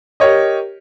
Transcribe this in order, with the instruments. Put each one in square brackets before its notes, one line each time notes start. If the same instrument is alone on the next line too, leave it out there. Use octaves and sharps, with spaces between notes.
[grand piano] G4 A#4 C#5 D#5